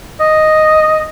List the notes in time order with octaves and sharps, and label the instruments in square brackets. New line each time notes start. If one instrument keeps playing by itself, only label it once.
[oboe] D#5